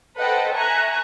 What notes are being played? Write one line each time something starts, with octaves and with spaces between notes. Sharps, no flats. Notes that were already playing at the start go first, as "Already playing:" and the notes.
A4 B4 C5 D#5 F#5 G5
E5 G#5 A#5 C#6 F#6